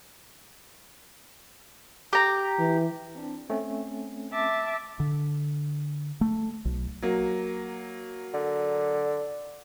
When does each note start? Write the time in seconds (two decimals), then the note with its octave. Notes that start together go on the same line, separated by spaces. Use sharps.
2.13 G4 A#5
2.59 E3
3.15 C4 D4
3.50 A3 C4 C#4
4.32 E5 A5 D6
5.00 D3
6.21 A3
6.65 B1
7.02 F#3 A#3
8.34 D3